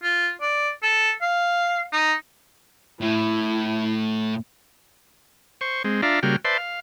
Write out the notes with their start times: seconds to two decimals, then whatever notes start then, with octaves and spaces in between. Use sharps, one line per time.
0.03 F4
0.41 D5
0.83 A4
1.22 F5
1.93 D#4
3.01 A2 E4
5.61 C5 C#6
5.84 G#3 C4
6.02 D4 F4 D5 E5 F5 A#5
6.23 C#3 G3 A#3 F#4 G5 F6
6.45 B4 C5 D5 E5 A5 C6
6.58 F5